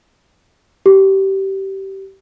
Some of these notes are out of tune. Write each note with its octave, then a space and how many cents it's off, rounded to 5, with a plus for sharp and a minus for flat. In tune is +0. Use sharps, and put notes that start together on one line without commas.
G4 -20